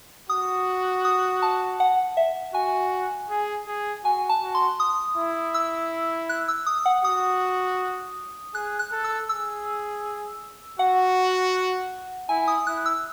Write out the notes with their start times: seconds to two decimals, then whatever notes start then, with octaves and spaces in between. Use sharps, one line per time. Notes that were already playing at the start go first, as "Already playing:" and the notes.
0.30 F#4 D#6
1.05 D#6
1.42 A5
1.80 F#5
2.17 E5
2.54 F#4 G#5
3.30 G#4
3.67 G#4
4.04 F#4 G#5
4.29 A5
4.42 F#4
4.55 C6
4.80 D#6
5.17 E4
5.54 E6
6.29 F#6
6.48 E6
6.66 D#6
6.86 F#5
7.04 F#4 D#6
8.54 G#4 F#6
8.79 F#6
8.92 A4
9.04 E6
9.29 G#4 E6
10.79 F#4 F#5
12.29 E4 G#5
12.48 D#6
12.67 E4 F#6
12.86 E6